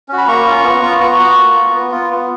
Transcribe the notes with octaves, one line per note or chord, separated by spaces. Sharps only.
C#4 F#4
B5
A#3 A#5 C#6
C#4 F4
B3
F4
B3 A#5 C#6
F#4
A#3
F4
B3
F4
B3